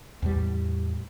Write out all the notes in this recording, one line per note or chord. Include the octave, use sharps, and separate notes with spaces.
E2 A2 G3